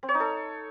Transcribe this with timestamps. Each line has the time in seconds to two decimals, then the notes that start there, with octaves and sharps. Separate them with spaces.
0.03 C4
0.09 C#5
0.14 D#4
0.20 A4